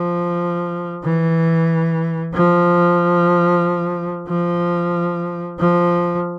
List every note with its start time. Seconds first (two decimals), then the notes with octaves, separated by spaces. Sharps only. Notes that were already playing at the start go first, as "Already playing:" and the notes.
Already playing: F3
1.04 E3
2.34 F3
4.28 F3
5.59 F3